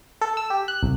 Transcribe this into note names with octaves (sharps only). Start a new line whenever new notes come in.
A4
E6
G4
F#6
C2